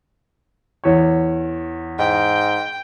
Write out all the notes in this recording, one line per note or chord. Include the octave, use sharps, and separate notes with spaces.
E2 C#5
G#2 G5